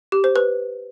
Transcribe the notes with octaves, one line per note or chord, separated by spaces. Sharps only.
G4
C5
B4